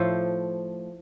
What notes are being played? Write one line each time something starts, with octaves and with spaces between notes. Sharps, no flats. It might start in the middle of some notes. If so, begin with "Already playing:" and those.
Already playing: A2 F3 A4 C5